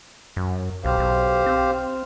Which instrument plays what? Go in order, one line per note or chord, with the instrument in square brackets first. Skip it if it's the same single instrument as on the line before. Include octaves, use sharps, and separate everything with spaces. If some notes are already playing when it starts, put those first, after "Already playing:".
[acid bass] F#2
[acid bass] B1 [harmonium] G4 C5 F5
[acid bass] B1
C4